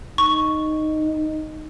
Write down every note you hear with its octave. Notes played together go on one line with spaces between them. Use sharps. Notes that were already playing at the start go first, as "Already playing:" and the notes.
D#4 C#6